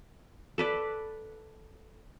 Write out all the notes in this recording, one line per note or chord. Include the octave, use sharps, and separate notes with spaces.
A4 B4 D5